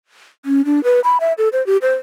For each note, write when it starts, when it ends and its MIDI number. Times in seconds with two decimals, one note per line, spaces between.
0.46 0.65 61
0.65 0.83 62
0.84 1.00 71
1.04 1.18 83
1.20 1.33 76
1.38 1.49 69
1.53 1.65 72
1.67 1.77 67
1.82 1.94 72